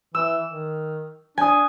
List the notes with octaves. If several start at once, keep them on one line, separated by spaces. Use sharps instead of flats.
E3 E6
D#3
D4 G#5 D#6